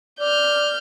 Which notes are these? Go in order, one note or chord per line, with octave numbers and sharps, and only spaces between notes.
D5 F6 G6